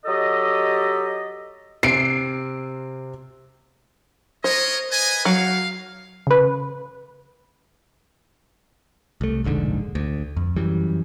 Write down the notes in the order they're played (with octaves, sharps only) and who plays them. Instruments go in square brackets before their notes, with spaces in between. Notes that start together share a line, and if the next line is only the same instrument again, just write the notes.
[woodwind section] F#3 G4 A4 D#5
[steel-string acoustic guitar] C3 [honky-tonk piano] C7 D7
[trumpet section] A#4 C#5 D#5 [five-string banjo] C5
[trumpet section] B4 D#5 G#5
[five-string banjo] F#3 [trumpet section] F5
[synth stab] C#3 B4
[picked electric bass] C2 A3
E1 A#1 G#2 D3
D2
F2
F#2 E3 G3